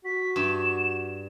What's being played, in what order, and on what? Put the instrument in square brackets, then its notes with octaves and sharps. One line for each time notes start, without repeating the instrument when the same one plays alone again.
[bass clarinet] F#4 [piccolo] B6
[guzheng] G2 [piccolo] E7